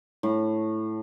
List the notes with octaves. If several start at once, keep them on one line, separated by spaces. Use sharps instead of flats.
A2